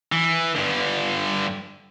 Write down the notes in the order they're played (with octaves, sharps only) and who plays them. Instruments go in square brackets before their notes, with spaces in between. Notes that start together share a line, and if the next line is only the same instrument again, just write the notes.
[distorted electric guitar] E3
G2 D3